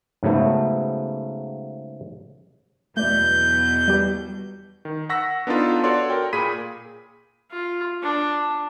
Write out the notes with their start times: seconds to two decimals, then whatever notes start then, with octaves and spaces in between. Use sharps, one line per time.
0.23 G#2 C#3 F#3 A3 B3
2.97 E2 B2 F#3 A3 D5 G6
3.88 G3 G4
4.85 D#3
5.09 F#5 C#6 E6 A#6 B6
5.47 B3 D4 D#4 F4 A4
5.84 F#4 A4 C#5 D5 C6
6.10 A#4 G5
6.33 A#2 G#4 B5 B6 D#7
7.51 F4
8.03 D4